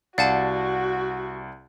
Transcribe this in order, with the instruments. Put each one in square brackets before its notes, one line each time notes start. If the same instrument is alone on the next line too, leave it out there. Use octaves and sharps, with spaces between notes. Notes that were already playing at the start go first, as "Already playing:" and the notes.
[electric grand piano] C2 D5 A6 [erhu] F#4 [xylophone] F5 F#5 A5